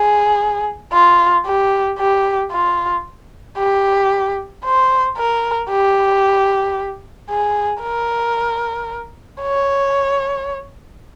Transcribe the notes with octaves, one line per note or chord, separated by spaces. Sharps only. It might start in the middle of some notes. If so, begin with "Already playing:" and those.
Already playing: G#4
F4
G4
G4
F4
G4
C5
A#4
G4
G#4
A#4
C#5